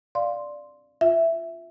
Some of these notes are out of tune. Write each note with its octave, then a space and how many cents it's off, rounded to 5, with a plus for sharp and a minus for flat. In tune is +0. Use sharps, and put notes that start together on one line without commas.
D5 +0 F5 +0 C6 +0
F4 +0 E5 +5